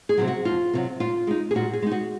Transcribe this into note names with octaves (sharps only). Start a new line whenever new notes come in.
G#4
C3 D#3 F#3
F#4
F2 F4
C3 D#3 F#3
A#2 F4
G#3 D#4
G#4
A#2 F#4
G#4
G#3 D#4
F#4